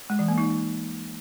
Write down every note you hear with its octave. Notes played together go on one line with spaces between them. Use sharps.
G#3
E3
A#3
D#4